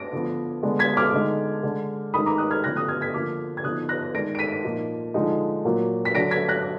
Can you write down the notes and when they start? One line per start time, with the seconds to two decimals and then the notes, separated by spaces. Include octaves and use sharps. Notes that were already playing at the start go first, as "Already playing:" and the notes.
Already playing: A#6 D7
0.12 D3 F3 B3
0.63 D3 G#3 B3 D4
0.79 G#6 B6
0.97 D6 F6
1.13 D3 G#3 D#4
1.63 D3 G#3 D4
2.14 D#3 G#3 D#4 B5 D#6
2.26 A#5 D6
2.38 D#6 F#6
2.51 F6 G#6
2.64 D3 F3 B3 F#6 A#6
2.76 D#6 F#6
2.88 F6 G#6
3.01 G#6 B6
3.14 D3 F3 A#3 D6 F6
3.57 G#6
3.64 D3 F3 B3 D#4 D#6 F#6
3.89 F#6 A#6
4.14 D#3 G#3 D4 A#6 D7
4.35 D7
4.39 B6 D#7
4.65 A#2 F3 A#3 D#4
5.14 D3 F3 G#3 D#4
5.65 A#2 F#3 A#3
6.05 B6
6.15 D3 F#3 D4 A#6 D7
6.31 G#6 B6
6.49 F#6 A#6